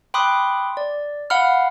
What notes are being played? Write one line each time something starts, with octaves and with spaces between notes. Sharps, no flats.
G5 B5 C6 D6 D#6 F#6
D5
F5 F#5 B5 F6